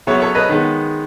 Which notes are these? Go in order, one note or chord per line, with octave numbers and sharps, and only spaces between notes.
C#3 F#3 B3 C#5 E5
A4 C#5
B4 D#5
D#3 G#3 B3